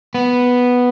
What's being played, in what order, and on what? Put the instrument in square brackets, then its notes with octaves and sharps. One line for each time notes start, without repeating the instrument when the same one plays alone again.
[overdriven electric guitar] B3